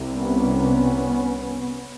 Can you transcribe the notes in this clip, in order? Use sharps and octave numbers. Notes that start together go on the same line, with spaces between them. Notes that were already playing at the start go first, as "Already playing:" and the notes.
Already playing: C2 C3
B3 C#4